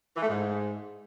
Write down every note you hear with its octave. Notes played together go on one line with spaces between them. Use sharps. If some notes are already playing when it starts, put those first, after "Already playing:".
E3
A3
G#2